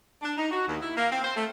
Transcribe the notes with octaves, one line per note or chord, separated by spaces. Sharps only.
D4
D#4
F#4
D#2
E4
A#3
C4
C5
A3